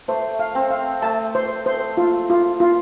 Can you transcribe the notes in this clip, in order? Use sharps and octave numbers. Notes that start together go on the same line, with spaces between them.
A3 C5
F5
C4
F5
A3 A5
C5
C5
F4
F4
F4